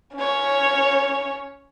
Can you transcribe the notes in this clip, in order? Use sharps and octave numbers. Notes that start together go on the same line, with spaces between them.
C#4 C#5